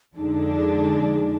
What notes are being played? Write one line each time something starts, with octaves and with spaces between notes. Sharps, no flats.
F2 D3 G#3 D4 D#4